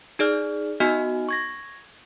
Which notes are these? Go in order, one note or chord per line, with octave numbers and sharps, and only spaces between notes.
D#4 G#4 D5 F6
B3 D#4 F#4 D#5 G#5 F6
C#6 G#6 A#6